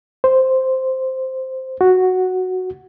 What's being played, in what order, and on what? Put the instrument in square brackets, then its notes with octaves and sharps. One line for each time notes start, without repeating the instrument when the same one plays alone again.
[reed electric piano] C5
F#4